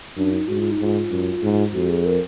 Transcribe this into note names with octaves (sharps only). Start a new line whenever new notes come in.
F#2 D4
D#4
G#2 F#4
F4
D#4
G#2 F4
F#2
G#2
F2 F#4
G#4
A#4